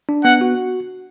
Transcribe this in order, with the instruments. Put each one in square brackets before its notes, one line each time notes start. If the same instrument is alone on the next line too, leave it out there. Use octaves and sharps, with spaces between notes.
[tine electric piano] D4
[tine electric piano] B3 [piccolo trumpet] F#5
[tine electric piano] F#4